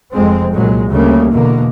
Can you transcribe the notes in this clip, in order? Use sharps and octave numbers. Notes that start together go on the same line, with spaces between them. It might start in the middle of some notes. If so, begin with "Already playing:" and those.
F1 F2 G#3 C4
C2 A#2 F#3 G#3
D2 C#3 G3 A3 A#3
E2 B2 D3 A#3